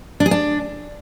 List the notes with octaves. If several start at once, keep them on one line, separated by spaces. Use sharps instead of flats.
D4
G#4
D4